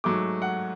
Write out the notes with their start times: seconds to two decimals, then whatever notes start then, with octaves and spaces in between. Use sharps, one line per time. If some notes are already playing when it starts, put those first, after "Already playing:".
0.04 G#2 F#3 A3 D6
0.42 F#5